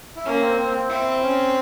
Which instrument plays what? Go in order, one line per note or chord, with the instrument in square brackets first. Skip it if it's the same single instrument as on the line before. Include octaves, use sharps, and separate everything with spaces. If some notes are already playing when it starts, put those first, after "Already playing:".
[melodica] E4
[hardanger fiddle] A#3 [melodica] C#4
[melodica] C4
C4
C4
[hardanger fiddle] C4 [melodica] E4
[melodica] C#4